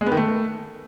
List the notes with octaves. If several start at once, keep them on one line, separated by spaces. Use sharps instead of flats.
G#3
B3
D#3
A3